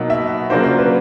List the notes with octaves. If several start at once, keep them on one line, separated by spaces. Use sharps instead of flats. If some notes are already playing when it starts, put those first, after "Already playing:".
Already playing: B2 F#3 A#3 D#4
E5
C#3 F#3 A#3 D4 F4 C5
C5
B4